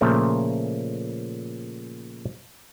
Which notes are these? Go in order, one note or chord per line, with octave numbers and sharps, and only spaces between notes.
A#2 C#3 F3 A3